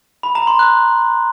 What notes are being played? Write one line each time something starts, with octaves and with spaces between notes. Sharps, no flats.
B5
A#5
C6
F#6